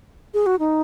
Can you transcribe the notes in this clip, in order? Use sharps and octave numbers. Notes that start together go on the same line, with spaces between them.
G#4
F#4
D#4